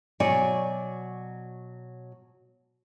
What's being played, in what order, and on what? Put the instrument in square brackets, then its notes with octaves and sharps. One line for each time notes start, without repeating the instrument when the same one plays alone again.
[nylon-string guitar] B2 F#3 C#5 D5 G#5